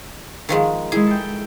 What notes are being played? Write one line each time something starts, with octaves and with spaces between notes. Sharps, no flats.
D#3 F3 G#3
G#3 E4 G#4
A4 G5